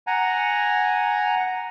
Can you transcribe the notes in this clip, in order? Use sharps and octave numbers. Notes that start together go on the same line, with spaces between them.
F#5 G#5 A#5